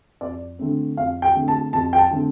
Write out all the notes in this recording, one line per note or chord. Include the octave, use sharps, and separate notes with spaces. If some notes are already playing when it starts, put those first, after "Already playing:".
F2 D5
D3 A3 C4
F2 F5
G5
D3 A3 C4
A5
F2 A5
G5
A5
D3 A3 C4